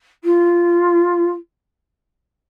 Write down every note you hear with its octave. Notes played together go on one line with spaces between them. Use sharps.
F4